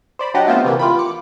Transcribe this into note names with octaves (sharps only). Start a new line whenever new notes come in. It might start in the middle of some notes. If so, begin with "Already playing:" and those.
C5 D5 B5
F#3 D4 G4 D#5 F#5
A3 B3 C4 F4 C5
C3 E3 A#3
F4 G5 B5
D6 C#7